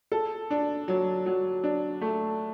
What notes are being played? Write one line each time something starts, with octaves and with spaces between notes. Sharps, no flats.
A4
D4
F#3
F#3
D4
A3